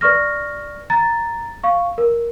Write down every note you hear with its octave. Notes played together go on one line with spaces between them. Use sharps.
B4 D5 C#6 F6 A#6
A#5 A6
F5 C#6
A#4